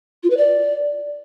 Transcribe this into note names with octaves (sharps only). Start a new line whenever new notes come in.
F4
B4
D5